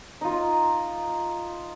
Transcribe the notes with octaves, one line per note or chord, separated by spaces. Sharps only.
D#4 F4